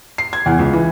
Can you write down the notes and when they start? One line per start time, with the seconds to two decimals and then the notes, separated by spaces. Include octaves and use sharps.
0.18 C7
0.33 G#6
0.46 E2
0.59 C#2
0.73 E3